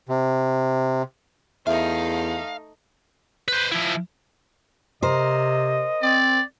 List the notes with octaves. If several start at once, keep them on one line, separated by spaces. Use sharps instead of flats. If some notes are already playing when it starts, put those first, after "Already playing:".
C3
E2 A3 D#4 E5 F5
B4 C5
F3 E4
C3 A#4 C5 D#5
C4 D5